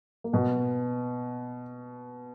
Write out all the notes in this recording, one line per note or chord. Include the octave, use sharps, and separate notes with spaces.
A#3
B2 B3